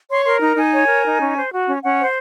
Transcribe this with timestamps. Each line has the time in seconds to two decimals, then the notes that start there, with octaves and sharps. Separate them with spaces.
0.09 C#5 C6
0.25 A#4 C6
0.41 D#4 A#5
0.56 D#4 G#5
0.72 C#5
0.88 A#4
1.04 D#4
1.19 C#4
1.36 C5
1.51 F#4
1.67 C#4
1.82 C#4 F#5
1.99 C5